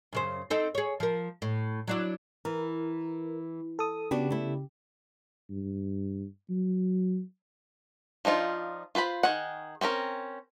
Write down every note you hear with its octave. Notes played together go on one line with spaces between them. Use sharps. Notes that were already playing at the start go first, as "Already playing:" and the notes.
F#2 C#3 C5
C4 D#4 A4
G#4 C#5
F3 A#4
A2
F#3 D4 E4
E3 A#4
A4 D#6
C#3 B3 D4 F#4 G4
A3 E4
G2
F#3
F3 D4 D#4 F4
F4 B4 C5 B5
D#3 G#4 F#5
C4 C#4 E4 A#4